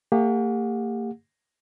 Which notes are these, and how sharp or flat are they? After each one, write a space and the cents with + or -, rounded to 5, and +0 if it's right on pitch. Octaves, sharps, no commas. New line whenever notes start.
A#3 -40 G4 +35 F#5 -35